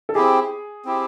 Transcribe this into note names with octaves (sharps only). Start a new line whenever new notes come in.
A4
C4 E4 G4 G#4
C4 E4 G4